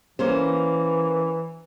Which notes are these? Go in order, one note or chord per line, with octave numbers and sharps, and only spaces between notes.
E3 A#3 C#4 C5